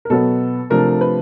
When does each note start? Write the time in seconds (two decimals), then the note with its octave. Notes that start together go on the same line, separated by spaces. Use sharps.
0.05 A#4
0.10 B2 F#3 B3 A4
0.70 C3 F3 A3 D4 A#4
1.01 B4